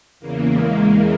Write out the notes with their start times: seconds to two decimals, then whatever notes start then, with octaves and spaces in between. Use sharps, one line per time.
0.20 E2 C#3 E3 A#3
0.49 G#3
0.78 A#3